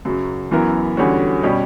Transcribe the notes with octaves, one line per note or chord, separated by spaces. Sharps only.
F#2 C#3 F#3
F#2 E3 B3 E4 A#4
E2 D3 G3 C#4 F#4
B2 G3 C#4 G4